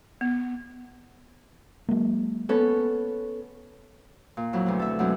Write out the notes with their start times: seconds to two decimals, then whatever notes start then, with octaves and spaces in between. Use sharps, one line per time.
0.21 B3
1.89 F#3 G#3 A#3
2.49 B3 C#4 A4
4.37 A#2
4.53 F2 F#3 E4
4.66 D2 B2 C4
4.79 A4 E5
4.99 F#2 B2 F#3 G#3 C4 E4